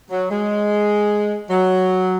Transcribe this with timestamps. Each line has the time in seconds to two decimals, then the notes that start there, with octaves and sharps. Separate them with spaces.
0.10 F#3
0.30 G#3
1.50 F#3